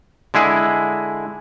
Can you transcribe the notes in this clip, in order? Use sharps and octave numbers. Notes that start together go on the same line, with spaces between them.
D3 G#3 E4 G#4